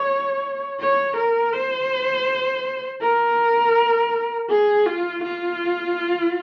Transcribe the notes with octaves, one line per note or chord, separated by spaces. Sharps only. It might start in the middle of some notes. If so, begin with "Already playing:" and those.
Already playing: C#5
C#5
A#4
C5
A#4
G#4
F4
F4